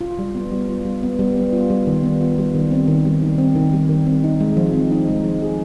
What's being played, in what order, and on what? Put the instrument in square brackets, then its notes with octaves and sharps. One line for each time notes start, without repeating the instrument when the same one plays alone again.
[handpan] F4
G3
B3
G3
F4
G3
B3
G3
B3
F4
G3
D#3
B3
F4
G3
D#3
C4
D#3
G3
D#3
C4
D#3
G3
D#3
C4
D#4
G#3
F3
C4
D#4
G#3
F3
G#4